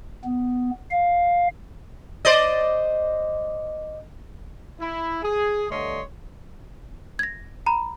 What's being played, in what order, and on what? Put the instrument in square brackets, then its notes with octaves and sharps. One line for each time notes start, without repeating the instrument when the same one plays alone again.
[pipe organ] B3
F5
[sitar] C5 D5 D#5
[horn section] E4
G#4
G2 D3 A3 C#5 D#5 C6
[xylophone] G#6 A#6
A#5 B5